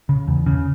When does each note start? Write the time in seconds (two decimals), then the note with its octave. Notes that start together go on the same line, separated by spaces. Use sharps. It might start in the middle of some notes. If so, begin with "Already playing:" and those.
0.09 C#3
0.28 E2
0.46 C#3